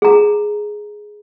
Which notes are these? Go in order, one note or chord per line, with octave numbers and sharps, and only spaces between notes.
G#4 A#5